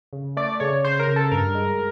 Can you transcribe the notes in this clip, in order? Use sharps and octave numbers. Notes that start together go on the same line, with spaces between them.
C#3
A3 D5
C#3 C#5
C#3 C5
A#4
C#3
A4
G2 A#4
G#3